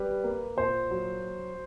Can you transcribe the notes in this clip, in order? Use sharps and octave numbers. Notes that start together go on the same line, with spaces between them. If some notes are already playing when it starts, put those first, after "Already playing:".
Already playing: G3 B4
A#3
A#2 C5
F#3